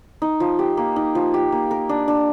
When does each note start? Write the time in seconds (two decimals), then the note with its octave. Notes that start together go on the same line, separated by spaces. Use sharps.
0.22 D#4
0.40 F3
0.59 G4
0.77 A#3
0.96 D#4
1.15 F3
1.34 G4
1.52 A#3
1.71 A#4
1.89 D4
2.08 D4